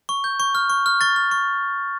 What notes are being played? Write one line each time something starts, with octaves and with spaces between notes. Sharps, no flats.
C#6
G6
C#6
F6
C#6
F6
C#6 A6
F6
C#6